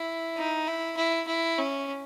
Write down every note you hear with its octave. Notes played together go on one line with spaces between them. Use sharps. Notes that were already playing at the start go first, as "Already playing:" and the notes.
Already playing: E4
D#4
E4
E4
E4
C#4